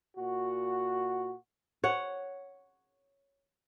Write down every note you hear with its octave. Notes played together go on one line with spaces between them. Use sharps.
A#2 F#4
C#5 F#5